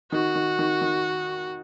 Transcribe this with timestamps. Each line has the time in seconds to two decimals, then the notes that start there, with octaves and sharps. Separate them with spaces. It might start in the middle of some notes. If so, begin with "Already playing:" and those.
0.12 D#3 F#4
0.35 D#3
0.59 D#3
0.82 D#3